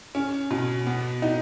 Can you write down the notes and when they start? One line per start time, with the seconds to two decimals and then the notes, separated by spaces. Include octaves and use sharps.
0.15 C#4
0.51 B2
0.87 B3
1.22 D#4